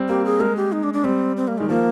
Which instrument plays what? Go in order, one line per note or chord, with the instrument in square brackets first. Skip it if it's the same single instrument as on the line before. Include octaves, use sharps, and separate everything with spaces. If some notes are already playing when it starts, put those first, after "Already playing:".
Already playing: [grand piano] G3 C4
[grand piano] A#3 [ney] G4
[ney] G#4
[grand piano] G#3 [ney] A#4
[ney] G4
D#4
D4
D4
[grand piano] G3 [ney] C4
[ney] C4
A#3
[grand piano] D#3 [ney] G#3
[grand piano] F3 [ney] A#3